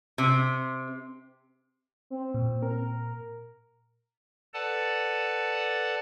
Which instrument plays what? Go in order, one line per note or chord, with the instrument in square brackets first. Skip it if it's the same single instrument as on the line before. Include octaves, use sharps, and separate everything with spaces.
[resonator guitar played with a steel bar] C3
[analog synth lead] C4
[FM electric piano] A#2
[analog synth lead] A#4
[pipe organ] A4 B4 D5 F#5 A5